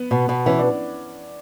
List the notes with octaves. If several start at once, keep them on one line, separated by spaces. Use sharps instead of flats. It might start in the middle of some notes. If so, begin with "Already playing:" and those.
Already playing: B3
B2
B2
E3 C#4
D4